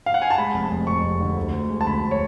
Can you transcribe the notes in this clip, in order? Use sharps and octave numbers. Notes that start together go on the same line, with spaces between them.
F5
F#5
G#5
A5
G#3 B5
F1
A5
F1
F2 C#6
F1
D3
D2
D2
G#3
A5
D2 B5
D2
C#5